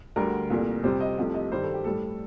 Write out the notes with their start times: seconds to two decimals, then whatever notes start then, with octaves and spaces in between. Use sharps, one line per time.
0.16 D2 D3 G3 A#4
0.50 C2 A#2 A3
0.83 F2 C3 G3 C5
1.00 D#5
1.18 C2 C3 F3 A3
1.34 D#5
1.51 G2 D#3 G3 C5
1.62 A4
1.74 G4
1.84 A2 G3 A4